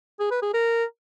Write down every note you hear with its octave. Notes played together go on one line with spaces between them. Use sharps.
G#4
B4
G#4
A#4